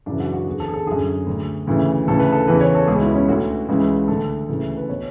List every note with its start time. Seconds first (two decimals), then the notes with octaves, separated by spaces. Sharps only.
0.06 F#2 C#3 E3 D4
0.20 F#4
0.33 F#4
0.47 E2 D3 G#4
0.60 A4
0.68 G#4
0.74 A4
0.86 F#2 D3 G#4
1.27 D2 D3
1.67 D2 C#3 E3
2.07 D2 C#3 E3 A4
2.20 B4
2.32 A4
2.47 E2 C#3 E3 B4
2.61 C#5
2.75 A4
2.87 C#2 B2 G#4
3.01 E4
3.14 C#4
3.28 D2 D3 F#4
3.68 C#2 C#3 E3
4.08 D2 D3 A4
4.49 D2 C#3 E3
4.77 B4
4.89 B2 C#5